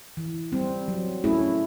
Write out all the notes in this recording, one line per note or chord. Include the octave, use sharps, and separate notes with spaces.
E3
G3 C4
F#3
A3 C#4 E4 G#4